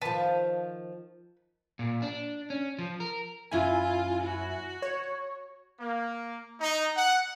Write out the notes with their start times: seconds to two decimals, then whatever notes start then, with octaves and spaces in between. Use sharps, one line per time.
0.01 D#3 F3 B4 A5
1.79 A#2
2.02 D4
2.50 C#4
2.79 F3
3.00 A#4
3.51 F#2 E4 F4 G#5
4.24 F#4
4.82 C#5
5.79 A#3
6.59 D#4
6.94 F#5